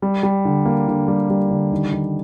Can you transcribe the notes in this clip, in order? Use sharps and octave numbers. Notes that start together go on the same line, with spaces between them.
G3
G3
D3
A#3
D3
G3
G3
D3
D#3
D#3